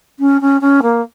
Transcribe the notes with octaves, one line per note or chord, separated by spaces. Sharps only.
C#4
C#4
C#4
A#3